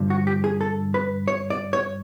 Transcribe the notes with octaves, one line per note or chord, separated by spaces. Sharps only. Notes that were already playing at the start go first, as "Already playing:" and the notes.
Already playing: G2 D3 F3
F#4
G4
G#4
A4
B4
C#5
D5
C#5